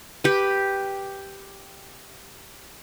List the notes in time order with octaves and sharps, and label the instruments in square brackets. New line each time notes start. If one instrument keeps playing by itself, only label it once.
[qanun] G4 B4